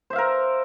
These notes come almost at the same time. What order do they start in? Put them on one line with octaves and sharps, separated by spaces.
C5 E5 F5 A#4